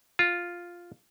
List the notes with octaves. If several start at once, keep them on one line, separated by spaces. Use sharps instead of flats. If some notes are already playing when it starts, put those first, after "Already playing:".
F4